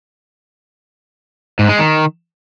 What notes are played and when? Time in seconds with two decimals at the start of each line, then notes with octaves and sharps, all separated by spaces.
1.59 G#2
1.69 G#3
1.79 D#3